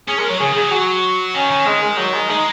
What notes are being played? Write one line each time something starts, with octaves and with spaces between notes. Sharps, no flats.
C#4 G#4
G#3 A#4
F#3 C#5
C#3 G#4
D#3
G#4
F#3
F#4
D#3 C#4
D#3
G#3
G#3
F#3
G#3
G#3 D#4